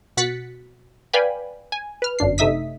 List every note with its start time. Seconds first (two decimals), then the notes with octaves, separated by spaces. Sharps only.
0.17 B2 F#4 F#6 A6 B6 C#7
1.13 B4 D5 F5 G5 G#5 B5
1.72 G#5
2.02 B4 F6
2.19 G1 F#2 D4 C7
2.38 C3 A3 D#4 E5 D#6 B6